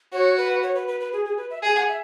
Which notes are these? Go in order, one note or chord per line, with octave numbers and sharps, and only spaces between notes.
F#4 C#5
B4
C#5
B4
B4
B4
G#4
G#4
B4
E5
G#4 G#5
F#5
E5